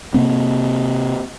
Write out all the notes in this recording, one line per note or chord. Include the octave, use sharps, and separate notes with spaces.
C3 A#3 C4